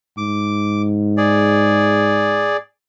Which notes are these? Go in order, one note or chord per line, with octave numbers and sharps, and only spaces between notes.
G#2 D6
G#4 D5